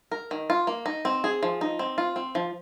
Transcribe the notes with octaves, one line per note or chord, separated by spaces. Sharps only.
A#4
D#3
F4
A#3
D#4
C4
G#4
F3
D#4
C4
F4
C4
F3